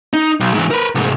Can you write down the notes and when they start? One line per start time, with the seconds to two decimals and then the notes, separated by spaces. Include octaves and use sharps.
0.13 D#4
0.40 B1
0.54 G#2 E3
0.71 A#4 B4
0.95 C2 G#2